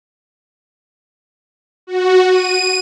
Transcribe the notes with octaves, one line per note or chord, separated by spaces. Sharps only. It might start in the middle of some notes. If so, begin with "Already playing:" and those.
F#4
D#7